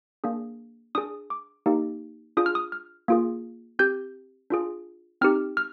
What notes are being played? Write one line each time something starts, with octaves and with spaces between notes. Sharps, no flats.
A#3 D4 G#4
D4 G#4 D#6
D6
A#3 D#4 G4
D4 F4 G#4 D#6
F6
D#6
F6
A#3 F4 G#4
C4 G4 G6
D4 F4 G#4
C4 D#4 G4 F6
F6